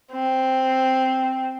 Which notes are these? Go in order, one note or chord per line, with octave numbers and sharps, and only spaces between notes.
C4